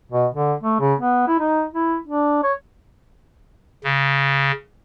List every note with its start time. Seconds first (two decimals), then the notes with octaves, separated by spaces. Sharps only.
0.12 B2
0.34 D3
0.63 A3
0.80 C#3
1.00 B3
1.27 E4
1.39 D#4
1.73 E4
2.07 D4
2.43 C#5
3.84 C#3